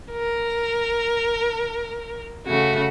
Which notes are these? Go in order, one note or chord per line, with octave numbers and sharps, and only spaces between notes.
A#4
C#3 A3 F#4